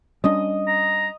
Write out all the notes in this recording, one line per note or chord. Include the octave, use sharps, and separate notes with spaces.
G3 C#4 D4 D#5
A#5